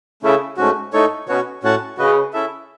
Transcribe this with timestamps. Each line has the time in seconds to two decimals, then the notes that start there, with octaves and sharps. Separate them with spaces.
0.23 C#3 A3 C#4 E4 A4 E5
0.57 G#2 A3 C#4 F#4
0.93 A2 A3 D#4 A4 C#5
1.27 B2 C#4 F#4 C#5
1.63 A2 C#4 F#4 C#5 F#5 A5
1.98 C#3 F#4 B4 D#5
2.33 C#4 E4 A4 E5